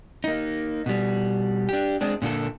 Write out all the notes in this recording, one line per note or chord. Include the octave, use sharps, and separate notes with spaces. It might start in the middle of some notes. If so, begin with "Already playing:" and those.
A#3 D#4
B2 G3
D4 G4
G#3 C4 D4
A#2 D3 A#3 A4